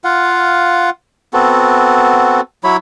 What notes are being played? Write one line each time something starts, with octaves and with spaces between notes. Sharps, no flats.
F4 F5 F#5
B3 C4 F#4 A4
F#3 E4 C#5 B5